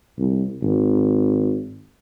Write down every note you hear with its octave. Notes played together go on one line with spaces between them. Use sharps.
C2
G#1